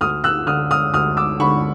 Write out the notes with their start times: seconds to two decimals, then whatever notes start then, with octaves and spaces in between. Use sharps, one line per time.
0.01 D2 D#6 F6
0.24 E6 F#6
0.47 D3 D#6 F6
0.71 D#6 F6
0.94 D2 D#6 F6
1.17 D6 E6
1.40 D3 B5 C#6